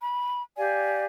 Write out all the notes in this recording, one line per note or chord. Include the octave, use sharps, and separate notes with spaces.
B5
G4 D5 F5 G#5